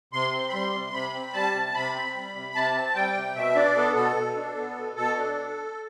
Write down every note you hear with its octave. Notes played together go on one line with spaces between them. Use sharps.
C3 C6
C4
B5
G3 C6
C3
C3 B5
C4
G3 A5
C3
C3 B5
C4
G3
C3
C3 A5
C4
G3 G5
C3
B2 E5
D4 D5
B3 A4
B2 A4
B2
D4
B3
B2
B2 A4
D4